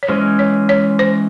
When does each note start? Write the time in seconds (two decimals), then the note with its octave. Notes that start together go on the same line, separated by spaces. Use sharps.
0.03 C#5
0.08 E3 G#3 C#4 C5
0.39 C#5
0.69 C#5
0.99 C5